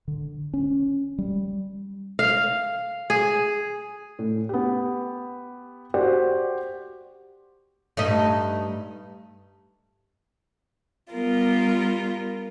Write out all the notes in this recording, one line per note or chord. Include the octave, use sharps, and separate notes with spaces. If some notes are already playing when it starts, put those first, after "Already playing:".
D3
C#4
G3
F5
G#4
A2
B3 G4
F#4 G4 C5 D5 F#5
G2 A3 D#4
G3 B3 F4 A#4